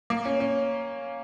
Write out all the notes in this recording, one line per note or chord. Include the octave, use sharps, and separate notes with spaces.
A#3
C#4
C#4